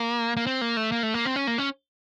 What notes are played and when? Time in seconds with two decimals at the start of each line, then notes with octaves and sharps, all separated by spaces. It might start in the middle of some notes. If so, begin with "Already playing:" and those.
Already playing: A#3
0.37 A#3
0.47 C4
0.61 A#3
0.77 A3
0.92 A#3
1.03 A3
1.14 A#3
1.25 C4
1.36 C#4
1.47 A#3
1.58 C#4